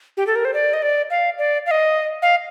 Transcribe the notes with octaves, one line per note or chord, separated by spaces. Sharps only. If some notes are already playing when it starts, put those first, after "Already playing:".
G4
A4
A#4
C5
D5
D#5
D5
F5
D5
F5
D#5
F5